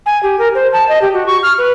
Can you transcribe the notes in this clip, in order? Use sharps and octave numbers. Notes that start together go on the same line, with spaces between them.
G#5
G4
A#4
C5
A5
D#5
G4
F#4
C#6
F6
B4